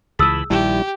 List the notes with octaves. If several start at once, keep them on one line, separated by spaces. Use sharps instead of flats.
C#2 E3 G#4 A5 B5 D#6 E6
A#1 D#3 G3 E4 G4 A5